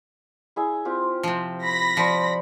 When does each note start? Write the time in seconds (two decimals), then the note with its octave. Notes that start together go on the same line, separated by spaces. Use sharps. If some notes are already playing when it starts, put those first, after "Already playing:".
0.56 E4 G#4 E5
0.85 C4 F4 G4
1.23 C3 F3
1.61 B5 A#6 B6
1.97 F3 G3 C5